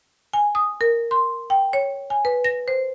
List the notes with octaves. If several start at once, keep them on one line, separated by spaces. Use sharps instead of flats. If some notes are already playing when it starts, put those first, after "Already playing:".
G#5
D#6
A#4
C6
G5
C#5
G#5
B4
A#6
C5